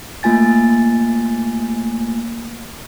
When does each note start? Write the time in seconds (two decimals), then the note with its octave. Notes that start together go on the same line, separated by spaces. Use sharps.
0.23 A3 A#3 F4 G#5 A6